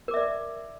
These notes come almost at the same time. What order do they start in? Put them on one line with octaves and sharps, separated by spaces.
A#4 D6 E5 D5